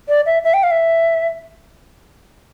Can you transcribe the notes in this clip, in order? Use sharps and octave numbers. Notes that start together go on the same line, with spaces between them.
D5
E5
E5
G5
F5
E5